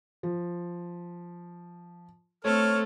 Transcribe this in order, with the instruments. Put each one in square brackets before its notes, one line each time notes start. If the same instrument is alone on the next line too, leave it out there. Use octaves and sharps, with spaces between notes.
[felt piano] F3
[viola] A3 [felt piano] C4 C5 [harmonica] A4 F6 [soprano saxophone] C#5